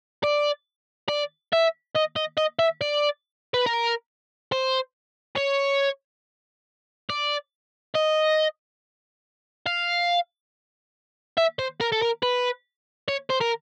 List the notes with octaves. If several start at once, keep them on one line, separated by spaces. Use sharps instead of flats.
D5
D5
E5
D#5
D#5
D#5
E5
D5
B4
A#4
C5
C#5
D5
D#5
F5
E5
C5
A#4
A4
A#4
B4
C#5
C5
A#4